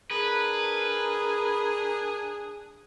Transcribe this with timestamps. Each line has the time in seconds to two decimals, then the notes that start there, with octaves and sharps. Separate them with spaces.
0.11 D4 G#4 A#4 B4